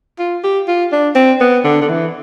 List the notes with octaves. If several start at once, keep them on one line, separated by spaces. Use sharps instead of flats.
F4
G4
F4
D4
C4
B3
D3
D3
E3